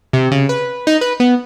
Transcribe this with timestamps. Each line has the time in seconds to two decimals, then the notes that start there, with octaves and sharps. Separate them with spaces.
0.13 C3
0.31 C#3
0.49 B4
0.87 D#4
1.01 B4
1.20 B3